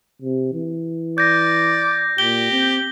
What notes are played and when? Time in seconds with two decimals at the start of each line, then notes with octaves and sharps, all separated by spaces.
0.22 C3
0.53 E3
1.18 D5 G6 A#6
2.18 A#2 G4 G7
2.52 C4